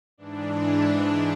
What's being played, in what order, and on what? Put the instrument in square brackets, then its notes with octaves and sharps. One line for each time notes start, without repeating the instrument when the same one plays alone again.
[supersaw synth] G#2 E3 D4